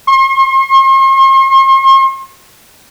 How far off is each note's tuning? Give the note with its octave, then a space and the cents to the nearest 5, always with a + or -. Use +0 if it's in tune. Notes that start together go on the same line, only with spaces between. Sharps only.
C6 +45